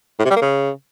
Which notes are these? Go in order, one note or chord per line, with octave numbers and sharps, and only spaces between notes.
A2
C3
G3
A#3
C#3